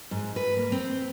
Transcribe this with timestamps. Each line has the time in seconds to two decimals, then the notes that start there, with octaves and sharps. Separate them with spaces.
0.11 G#2
0.36 B4
0.57 A#3
0.72 C4